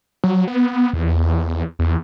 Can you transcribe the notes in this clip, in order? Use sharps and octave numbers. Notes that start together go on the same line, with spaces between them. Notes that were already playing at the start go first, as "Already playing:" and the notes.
F#3
B3
E2
E2